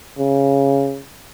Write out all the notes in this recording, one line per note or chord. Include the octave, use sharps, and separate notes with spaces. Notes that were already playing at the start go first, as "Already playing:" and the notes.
C#3